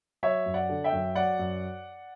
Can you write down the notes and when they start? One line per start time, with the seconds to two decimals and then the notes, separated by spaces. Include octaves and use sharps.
0.23 F#3 C#5 E5
0.46 F#2
0.54 D5 F#5
0.69 D3
0.84 E5 G5
0.92 F#2
1.15 F#3 D5 F#5
1.39 F#2